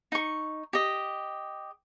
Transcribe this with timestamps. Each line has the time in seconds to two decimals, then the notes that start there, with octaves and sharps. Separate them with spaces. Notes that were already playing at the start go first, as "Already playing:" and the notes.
0.12 D#4 C#6
0.73 G4 D#5